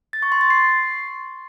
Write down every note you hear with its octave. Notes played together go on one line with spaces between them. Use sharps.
A6
C#6
C6
A6
C7